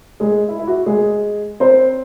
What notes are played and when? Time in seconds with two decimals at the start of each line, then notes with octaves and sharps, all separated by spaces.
0.20 G#3 G#4
0.48 E4
0.59 E4
0.67 F#4
0.86 G#3 G#4
1.60 C4 C5